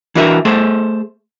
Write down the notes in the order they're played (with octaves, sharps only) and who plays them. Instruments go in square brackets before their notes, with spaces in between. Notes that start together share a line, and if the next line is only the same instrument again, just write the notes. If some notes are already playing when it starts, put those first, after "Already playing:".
[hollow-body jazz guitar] E3 D4 F#4 A#4 C#5 E5
A3 G#4 A4 C5